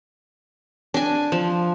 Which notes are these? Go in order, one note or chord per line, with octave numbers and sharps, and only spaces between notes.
D4 G#5
F3